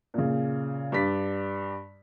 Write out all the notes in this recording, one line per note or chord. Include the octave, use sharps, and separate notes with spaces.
A#2 C#3
G2 D5 B6